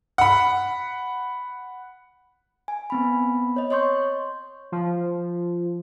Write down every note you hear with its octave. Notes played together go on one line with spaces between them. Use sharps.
F#5 B5
G#5
B3 C4 B5
C#5 D#5
C#5 D#5 C6 C#6 G6
F3